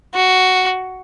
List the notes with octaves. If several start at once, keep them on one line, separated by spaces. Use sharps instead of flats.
F#4